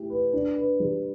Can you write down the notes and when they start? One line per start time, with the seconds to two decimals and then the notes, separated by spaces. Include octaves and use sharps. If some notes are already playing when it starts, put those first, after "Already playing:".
Already playing: A3 E4 G4
0.10 B4
0.33 D4
0.56 B4
0.80 G3